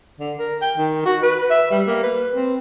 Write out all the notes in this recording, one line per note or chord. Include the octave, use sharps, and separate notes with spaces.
D3
A#4
G5
D#3
F#4
B4
E5
G3
A#3
B4
C4